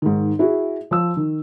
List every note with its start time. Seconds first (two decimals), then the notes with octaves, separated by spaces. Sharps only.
0.02 G#2 D#3
0.39 E4 F#4 G#4
0.91 F3 E6
1.17 D#3